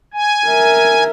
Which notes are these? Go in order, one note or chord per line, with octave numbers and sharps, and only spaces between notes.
G#5
A#4 E5